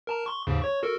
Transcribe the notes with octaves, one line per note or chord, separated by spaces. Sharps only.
A#4 A5 A#5
C6 C#6
D#2 G#2 C#3
C#5 C#6
F#4 A4 A#4